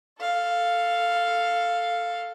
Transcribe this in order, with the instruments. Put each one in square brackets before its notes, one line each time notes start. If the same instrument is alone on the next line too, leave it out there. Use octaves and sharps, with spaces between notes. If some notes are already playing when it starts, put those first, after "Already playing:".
[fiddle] A4 F5